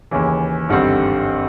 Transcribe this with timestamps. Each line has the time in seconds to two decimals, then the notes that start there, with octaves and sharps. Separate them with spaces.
0.11 D#2 C#3 E3
0.69 G#1 G2 D3 G3 C4